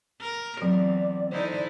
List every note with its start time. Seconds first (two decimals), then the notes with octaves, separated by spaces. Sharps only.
0.20 A#4
0.62 E2 F#3 C4 D5
1.32 D3 D#4 E4 C5